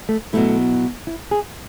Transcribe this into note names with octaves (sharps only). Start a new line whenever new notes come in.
A3
B2 F#3 A3 B3 E4
E4
G#4